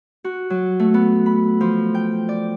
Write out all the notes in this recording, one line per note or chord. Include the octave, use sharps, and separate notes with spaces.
F#4
F#3
A3
B3
B5
F3
G5
D5